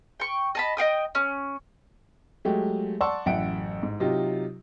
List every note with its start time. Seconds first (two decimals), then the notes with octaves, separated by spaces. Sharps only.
0.20 G5 C#6
0.55 D#5 A5 B5
0.77 D#5 F5 G5 D#6
1.15 C#4
2.45 F#3 G#3 A3 G4
3.01 D5 F#5 A5 C6 C#6 E6
3.26 A1 F#2 E5 F#5 G5 D7
3.83 G#2
4.00 C3 F#3 D#4 F4 G4